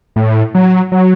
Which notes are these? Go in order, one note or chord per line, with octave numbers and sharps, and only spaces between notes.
A2
F#3
F#3